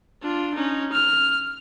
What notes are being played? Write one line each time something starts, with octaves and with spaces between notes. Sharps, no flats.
D4 F4
C#4 D#4
F6